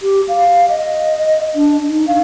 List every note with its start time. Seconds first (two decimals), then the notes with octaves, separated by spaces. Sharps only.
0.03 G4
0.28 F5
0.69 D#5
1.55 D4
1.89 D#4
2.07 F5